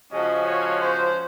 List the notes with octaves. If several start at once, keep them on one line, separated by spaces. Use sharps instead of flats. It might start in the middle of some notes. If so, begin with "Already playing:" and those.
C#3 F3 G#3 C#4 F#4 D#5
C#5
C5